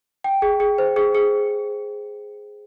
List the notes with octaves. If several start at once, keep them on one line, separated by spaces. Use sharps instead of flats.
G5
G#4
G#4
C5
G#4
G#4